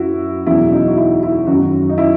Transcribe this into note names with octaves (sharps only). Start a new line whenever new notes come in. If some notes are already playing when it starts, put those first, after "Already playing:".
Already playing: F#2 F#3 E4 F#4
E2 B2 F#3 E4
D#4
F#4
E4
E4
F#2 D#3 F#3 F#4
D#4
E4